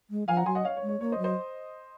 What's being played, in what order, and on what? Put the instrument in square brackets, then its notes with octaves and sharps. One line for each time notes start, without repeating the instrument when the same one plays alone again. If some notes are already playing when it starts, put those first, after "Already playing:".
[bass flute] G#3
[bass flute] F3 [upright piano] F5 G#5
[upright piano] F#5 A#5
[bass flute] F#3 [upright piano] G#5 C6
[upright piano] D#5 F#5
C#5 F5
C#5
[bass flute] G#3
[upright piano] C#5
[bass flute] A#3 [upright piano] C#5
[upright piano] C5 D#5
[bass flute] F#3
[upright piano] C5 D#5